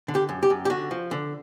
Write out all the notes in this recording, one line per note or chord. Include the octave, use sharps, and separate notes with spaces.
D3
G4
F#2
G4
F#2
G4
D3 F#4
F3
D3